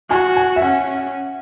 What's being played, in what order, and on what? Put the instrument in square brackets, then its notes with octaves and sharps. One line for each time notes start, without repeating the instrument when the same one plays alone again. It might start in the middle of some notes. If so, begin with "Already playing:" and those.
[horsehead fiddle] F#4 [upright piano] G#5
[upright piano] G#5
E5
[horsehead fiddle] C#4 [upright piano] F#5